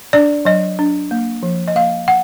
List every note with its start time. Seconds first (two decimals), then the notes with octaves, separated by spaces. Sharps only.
0.13 D4 D5
0.45 F#3 D#5
0.79 D4
1.11 A#3
1.43 F3
1.68 D#5
1.75 A#3 F5
2.08 F#5